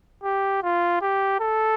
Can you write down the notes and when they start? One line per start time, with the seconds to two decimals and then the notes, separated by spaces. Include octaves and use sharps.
0.23 G4
0.63 F4
1.02 G4
1.40 A4